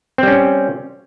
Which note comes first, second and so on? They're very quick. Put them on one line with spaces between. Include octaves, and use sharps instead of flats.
C4 G3 C#4